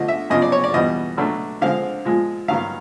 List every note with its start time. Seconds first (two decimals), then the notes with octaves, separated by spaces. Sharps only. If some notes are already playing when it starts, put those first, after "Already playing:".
Already playing: D3 F3 A3 D#5
0.08 E5
0.30 F#2 C#3 F3 D#5
0.42 D5
0.52 C#5
0.64 D5
0.74 E2 B2 G3 B3 D#5
1.18 B2 F#3 A3 D4
1.61 D3 F3 G#3 C4 F5
2.05 A#2 F3 G#3
2.48 G2 D#3 F#3 F5